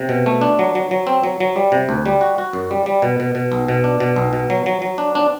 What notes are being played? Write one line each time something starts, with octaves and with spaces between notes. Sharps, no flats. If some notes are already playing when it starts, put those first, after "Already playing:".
Already playing: C3
B2
A3
D4
F#3
F#3
F#3
C4
F#3
F#3
G3
C3
D2
G3
F#4
F#4
F#2
G3
G3
B2
B2
B2
B1
B2
D4
B2
B1
B2
F#3
F#3
F#3
D4
D4